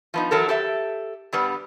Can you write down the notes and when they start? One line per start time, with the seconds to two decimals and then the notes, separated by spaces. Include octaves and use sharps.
0.14 F3 B3 D#4
0.31 E3 F#3 A4 A#4
0.49 G4 A4 E5
1.33 G2 G3 B3